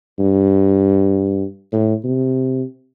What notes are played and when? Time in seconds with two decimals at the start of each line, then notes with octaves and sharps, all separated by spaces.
0.19 G2
1.72 A2
2.04 C3